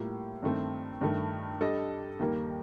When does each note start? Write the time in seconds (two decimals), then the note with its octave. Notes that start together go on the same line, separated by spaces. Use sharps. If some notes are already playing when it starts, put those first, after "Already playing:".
Already playing: A2 G3 A#3 F4
0.43 G2 D#3 A3 C4
1.01 G2 D#3 A3
1.61 G3 D4 A4 D#5
2.19 D#2 D#3 G3 A#3